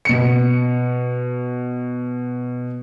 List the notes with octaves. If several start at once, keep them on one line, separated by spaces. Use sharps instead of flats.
B2 C#7